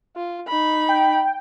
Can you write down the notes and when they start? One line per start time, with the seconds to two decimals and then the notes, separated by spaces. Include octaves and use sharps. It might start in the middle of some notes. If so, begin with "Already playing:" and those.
0.16 F4
0.48 D#4 B5
0.89 G5